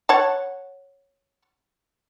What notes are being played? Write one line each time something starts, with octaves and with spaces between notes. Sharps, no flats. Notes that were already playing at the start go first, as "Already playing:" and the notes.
C#5 F#5 A5